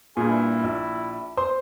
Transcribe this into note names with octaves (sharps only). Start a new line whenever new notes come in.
G2 A#2 G#4
E4
A#1
C5 C6